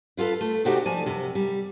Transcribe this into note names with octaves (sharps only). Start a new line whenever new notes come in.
E4 F4 G#4 A4 B4
A3
C3 D#4 F#4 G4 A4 D5
F3 D5 G#5 A5
F#2 C3
G3